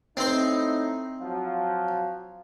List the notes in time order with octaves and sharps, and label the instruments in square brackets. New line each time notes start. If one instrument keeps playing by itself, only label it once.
[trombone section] A2 D#4 E4 [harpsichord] C4 C5
[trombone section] F3 F#3 F4